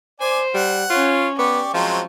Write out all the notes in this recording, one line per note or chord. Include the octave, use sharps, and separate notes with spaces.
C5 D5 G#5
G3 F#5
C#4 F4 C#5
B3 G4 D5 C#6
F3 F#3 G#3 C4